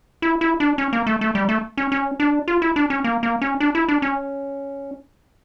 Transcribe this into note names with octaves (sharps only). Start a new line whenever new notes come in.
E4
E4
D4
C#4
A#3
A3
A3
G3
A3
C#4
C#4
D4
F4
E4
D4
C#4
A#3
A#3
C#4
D4
E4
D4
C#4